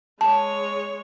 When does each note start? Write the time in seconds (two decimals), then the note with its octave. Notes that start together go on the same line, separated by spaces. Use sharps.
0.21 G#3 C#5 A5